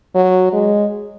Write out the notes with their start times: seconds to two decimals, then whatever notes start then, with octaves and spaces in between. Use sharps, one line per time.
0.15 F#3
0.53 G#3